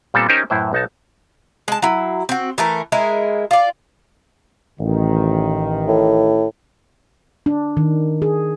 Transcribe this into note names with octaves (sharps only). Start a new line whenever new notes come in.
A#2 G3 B3 C4 A4
C#4 D#4 G4 A#4 C5 G#5
F#2 A2 E4 B4 C5
B1 D#4 F#5 A5
G#3 A5
F#3 E4
C4 F#4
E3 A3 A#4
G#3 E4 A#4
F4 D5
A1 D#3
A2
D4
D#3
G#4